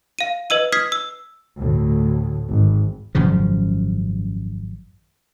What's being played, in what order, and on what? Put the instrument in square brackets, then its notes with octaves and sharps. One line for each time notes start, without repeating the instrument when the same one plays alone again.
[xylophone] F5 D#7
B4 D#5 E6 D#7
D#6 F6 G#6 B6 C7
E6
[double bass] D2 A2
G#1
[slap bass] G#1 F#2 C#3 F3